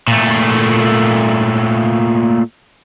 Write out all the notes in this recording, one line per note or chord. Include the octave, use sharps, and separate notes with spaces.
A#2 A3